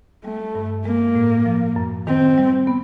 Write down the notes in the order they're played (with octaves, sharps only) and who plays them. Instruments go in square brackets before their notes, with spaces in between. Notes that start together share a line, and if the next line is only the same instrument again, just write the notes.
[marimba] G3 [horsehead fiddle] A3
[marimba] G2
[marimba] G#3 [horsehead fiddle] A#3
[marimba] A2
F3
F#2
[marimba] D#3 [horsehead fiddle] C4
[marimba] G3
B3